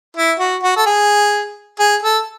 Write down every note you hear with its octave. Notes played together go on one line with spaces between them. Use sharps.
E4
F#4
F#4
A4
G#4
G#4
A4